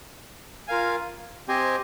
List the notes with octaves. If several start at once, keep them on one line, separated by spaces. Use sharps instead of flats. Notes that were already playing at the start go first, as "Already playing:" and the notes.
F4 A#4 F5 G#5
C4 G4 C5 D#5 G#5